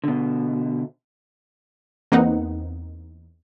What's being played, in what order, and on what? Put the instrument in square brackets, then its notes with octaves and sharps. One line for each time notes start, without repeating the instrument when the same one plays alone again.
[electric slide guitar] B2 D3
[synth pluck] E2 A#3 C4 D#4 B4 F#5